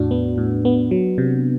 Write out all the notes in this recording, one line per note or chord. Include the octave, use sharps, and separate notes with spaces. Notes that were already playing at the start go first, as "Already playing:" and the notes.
Already playing: E2 A2 D4 F#4
B3
A2
B3
F#3
C3